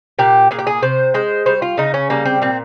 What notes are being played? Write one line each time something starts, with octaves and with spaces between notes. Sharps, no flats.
A#2 G4
A#2 G#4
G4
G#4
C3 C5
G#3 C5
G3 C5
F4
C#3 D#4
C#4
G3 A#3
C4
A#2 C4